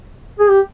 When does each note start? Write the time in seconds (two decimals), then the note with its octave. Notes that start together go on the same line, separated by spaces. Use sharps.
0.39 G#4
0.50 G4